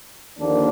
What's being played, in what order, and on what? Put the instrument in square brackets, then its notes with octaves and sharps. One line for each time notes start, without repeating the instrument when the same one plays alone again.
[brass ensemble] D#2 D3 F3 A#3 D4